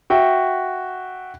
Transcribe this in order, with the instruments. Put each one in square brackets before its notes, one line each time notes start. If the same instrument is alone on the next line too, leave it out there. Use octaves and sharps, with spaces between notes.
[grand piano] F#4 E5 G5